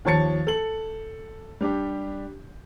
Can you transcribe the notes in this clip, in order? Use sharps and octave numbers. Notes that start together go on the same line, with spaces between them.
D#2 F3 C#5 A5 A6 C#7
A4 F#7
G3 D4 G4